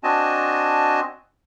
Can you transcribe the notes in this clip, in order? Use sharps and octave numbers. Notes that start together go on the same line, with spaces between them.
C4 D4 F#4 D#5 G#5 A5